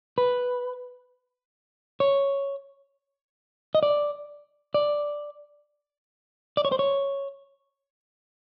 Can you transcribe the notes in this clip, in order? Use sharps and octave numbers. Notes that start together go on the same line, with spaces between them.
B4
C#5
D#5
D5
D5
D5
C#5
C5
C#5